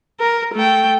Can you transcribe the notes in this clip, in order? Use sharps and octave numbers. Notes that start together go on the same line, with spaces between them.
A#4
A3 G5